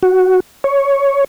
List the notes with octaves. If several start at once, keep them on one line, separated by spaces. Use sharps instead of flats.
F#4
C#5